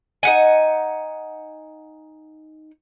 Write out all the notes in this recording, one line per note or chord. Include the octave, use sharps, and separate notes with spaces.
D#4 F#5 G#5